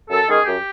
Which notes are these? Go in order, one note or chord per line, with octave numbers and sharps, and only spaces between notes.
F#2 A4
D#3 G#3 C#4 G#4
F#2 G4